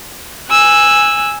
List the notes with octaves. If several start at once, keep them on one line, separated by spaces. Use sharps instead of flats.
G#5 E6 F#6